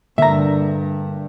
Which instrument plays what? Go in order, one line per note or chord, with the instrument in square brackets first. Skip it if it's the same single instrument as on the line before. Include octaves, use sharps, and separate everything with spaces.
[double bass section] G2 [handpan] D3 A#3 [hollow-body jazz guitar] E5 A#5